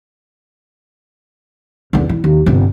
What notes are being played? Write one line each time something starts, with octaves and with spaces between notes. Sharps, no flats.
E2 D3
E3
D#2
G1 C3